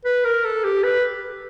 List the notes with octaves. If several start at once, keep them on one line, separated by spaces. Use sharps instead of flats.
B4
A#4
A4
G4
B4